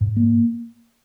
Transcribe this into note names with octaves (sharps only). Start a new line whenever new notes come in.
G#2
A#3